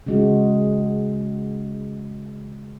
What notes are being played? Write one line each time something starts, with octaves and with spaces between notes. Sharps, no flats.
C#3 G#3 F#4